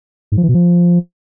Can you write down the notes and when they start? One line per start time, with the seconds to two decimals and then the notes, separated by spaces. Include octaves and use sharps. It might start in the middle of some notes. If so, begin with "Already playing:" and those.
0.32 G#2
0.37 F3
0.43 E3
0.49 B2
0.54 F3